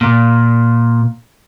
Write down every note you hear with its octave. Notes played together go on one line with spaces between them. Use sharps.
A#2